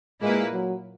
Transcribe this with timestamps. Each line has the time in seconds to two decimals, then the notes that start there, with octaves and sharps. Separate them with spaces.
0.22 A#2 G#3 A#3 E4 B4
0.52 F#3